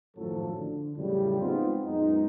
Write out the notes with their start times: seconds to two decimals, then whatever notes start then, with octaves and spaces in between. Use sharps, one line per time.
0.16 G#1 F#2 A2 F3 F#3 A4
0.58 D3
0.96 F2 A2 C#3 F#3 G3
1.40 G#3 B3 C4 D#4 F4
1.86 F#2 A#2 G#3 B3 D#4